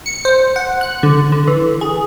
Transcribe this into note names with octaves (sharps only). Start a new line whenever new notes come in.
C#7
C5
F#5
F#6
D3
D3
E3
G#4